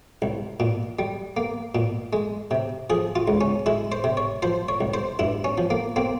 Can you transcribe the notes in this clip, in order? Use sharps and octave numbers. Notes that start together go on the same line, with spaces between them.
C2
A#2
G3
A#3
A#2
G#3
C3
F3 G#4
F4
C#2
C#4
G#3 E4
C5
C3
C#5
F3 C5
C#5
C2
C5
G2 E4
C#4
F3
A#3
A#3 C4